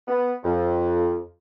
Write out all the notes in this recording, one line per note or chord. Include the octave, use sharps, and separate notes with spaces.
B3
F2